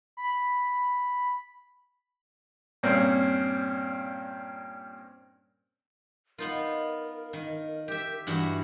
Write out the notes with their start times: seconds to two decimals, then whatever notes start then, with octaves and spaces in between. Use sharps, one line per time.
0.17 B5
2.83 G2 A#2 A#3 C4 C#4
6.38 B3 D#4 F4 A#4
7.33 D#3
7.88 G4 E5
8.27 G2 E3 F#4